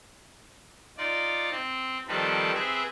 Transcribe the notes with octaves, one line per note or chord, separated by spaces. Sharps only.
D#4 F4 D5
C4
D#3 F3 G3 C4 A4 B4
C4 G#4 B4 E5